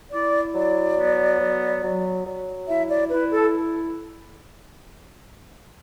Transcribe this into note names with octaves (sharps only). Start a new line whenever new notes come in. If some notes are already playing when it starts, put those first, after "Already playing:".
E4 D5
F#3 D5
B3
F#3
F#3
F#3
E4 E5
D5
E4 B4
A4